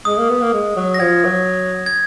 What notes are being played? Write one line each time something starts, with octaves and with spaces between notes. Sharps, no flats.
G#3 D#6
A#3
B3
A#3
G#3
F#3
A#6
F3 G#6
F#3
G#6